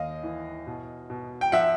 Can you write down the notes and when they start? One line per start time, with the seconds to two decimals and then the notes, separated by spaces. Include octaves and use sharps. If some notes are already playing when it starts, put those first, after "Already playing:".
Already playing: D#2 D#5 F5
0.23 E3
0.67 B2
1.10 B2
1.41 G5
1.52 F3 E5 F#5